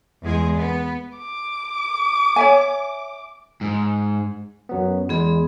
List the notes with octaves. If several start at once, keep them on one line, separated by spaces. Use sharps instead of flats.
E2 G#3 G#4
B3
D6
C#5 E5 G#5
G#2
F#2 F#3 B3
E2 G#3 B3 G#4